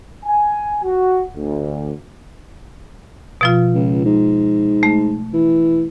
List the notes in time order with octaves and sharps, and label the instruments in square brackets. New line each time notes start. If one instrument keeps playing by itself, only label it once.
[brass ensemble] G#5
F#4
D2
[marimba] B2 F3 F4
[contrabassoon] C#2
G#2
[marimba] A3
[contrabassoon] E3